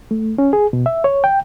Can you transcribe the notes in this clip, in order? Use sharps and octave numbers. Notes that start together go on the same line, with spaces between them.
A3
C#4
G#4
B2
E5
C#5
G5